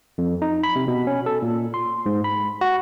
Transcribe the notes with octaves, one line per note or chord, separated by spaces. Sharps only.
F2
D#4
B5
C3
B2
C#4
A4
A#2
C6
G#2
B5
F#4